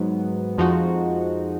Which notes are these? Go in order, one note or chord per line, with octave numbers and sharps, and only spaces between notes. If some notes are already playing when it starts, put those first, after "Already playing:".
Already playing: G#2 F#3 B3
F2 F3 G#3 D#4 F#4